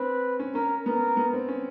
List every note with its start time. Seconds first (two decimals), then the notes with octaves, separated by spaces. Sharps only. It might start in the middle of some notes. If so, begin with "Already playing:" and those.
Already playing: C4 B4
0.40 C#4
0.55 C#4 A#4
0.86 B3 A#4
1.17 B3
1.33 C4
1.48 C#4